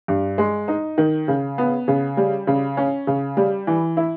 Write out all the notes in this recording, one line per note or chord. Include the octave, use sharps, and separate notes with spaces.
G2
G#3
D#4
D#3
C#3
B3
C#3
G3
C#3
C#4
C#3
G3
E3
E4